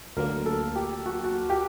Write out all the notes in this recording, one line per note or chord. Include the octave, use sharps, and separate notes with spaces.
D2 D3 F#3 A#3 A#4
A4
G4
F#4
F#4
G4